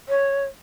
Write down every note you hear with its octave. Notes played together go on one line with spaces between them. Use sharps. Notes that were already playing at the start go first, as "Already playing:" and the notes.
C#5